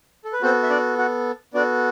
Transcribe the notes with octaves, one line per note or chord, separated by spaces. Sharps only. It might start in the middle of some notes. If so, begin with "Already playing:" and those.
A4
B4
B3 C4 F#4 A4 C5
E5
D4 D5
F#4 F#5
B3 D4 F#4 A4 D5